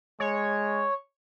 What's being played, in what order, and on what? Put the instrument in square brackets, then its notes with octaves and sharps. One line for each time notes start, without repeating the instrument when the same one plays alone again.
[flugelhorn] G#3 [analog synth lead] C#5